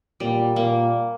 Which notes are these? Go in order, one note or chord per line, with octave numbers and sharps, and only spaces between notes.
A#2 G3
A#2 A#3